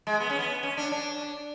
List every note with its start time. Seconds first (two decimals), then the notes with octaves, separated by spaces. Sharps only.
0.07 G#3
0.20 B3
0.30 C#4
0.39 B3
0.63 C#4
0.77 D4
0.92 D4